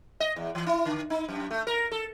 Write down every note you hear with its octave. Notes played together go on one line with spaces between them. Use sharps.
D#5
E2
E3
E4
D3
D#4
F#2
A3
A#4
A4